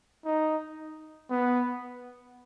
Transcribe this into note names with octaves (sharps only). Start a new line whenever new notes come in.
D#4
B3